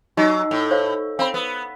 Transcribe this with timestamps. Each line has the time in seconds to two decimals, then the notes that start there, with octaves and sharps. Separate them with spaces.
0.17 F#3 D#4 G4 D#5
0.51 A2
0.71 C5 C#5 F5
1.19 C4 F5 B5
1.34 B3